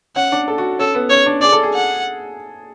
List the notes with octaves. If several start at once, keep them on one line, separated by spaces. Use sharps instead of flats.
C#4 F#5
D4
A4
F#4
C#4 A4
B3
C#4 C#5
D4
G#4 D5
A4
G#4
F#5